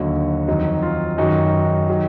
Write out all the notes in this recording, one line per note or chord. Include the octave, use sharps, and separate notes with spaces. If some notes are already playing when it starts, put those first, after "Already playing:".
Already playing: D#2 D3 F#3 D#4 F#4
F2 D#3 F#3 D#4
F4
F#2 D#3 F#3 D#4 F#4
D#3 F#3